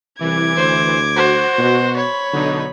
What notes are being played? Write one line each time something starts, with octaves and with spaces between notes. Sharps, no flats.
C2 E3 D6 G#6
D2 C5
F#4 C5
B2
C#5 B5
B1 D3 D#4